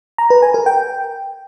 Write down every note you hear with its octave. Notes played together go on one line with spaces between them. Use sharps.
A#5
B4
G#5
A#4
G5